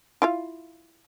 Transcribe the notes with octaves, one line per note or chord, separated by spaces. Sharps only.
E4 F4 F5